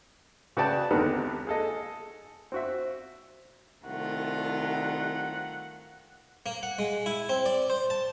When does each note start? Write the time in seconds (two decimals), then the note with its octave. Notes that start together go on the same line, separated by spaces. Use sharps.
0.57 C#3 F#4 B4 D5 G5 A5
0.90 G#1 D#2 D3 B3 D#4 G4
1.47 G#4 A4 D#5
2.52 C4 F#4 E5
3.84 C2 D#3 A3 F4 F#5
6.46 A#3
6.63 F#5
6.79 G#3
7.06 E4
7.29 C4
7.46 D5
7.70 C5
7.90 A5